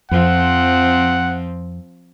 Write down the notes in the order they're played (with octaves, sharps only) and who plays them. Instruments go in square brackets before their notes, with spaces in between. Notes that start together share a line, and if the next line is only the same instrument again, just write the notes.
[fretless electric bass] F2 [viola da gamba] F3 C4 [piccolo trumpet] F#5